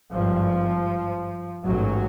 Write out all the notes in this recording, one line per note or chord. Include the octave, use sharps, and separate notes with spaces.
G#1 G2 F3
A1 G#2 F#3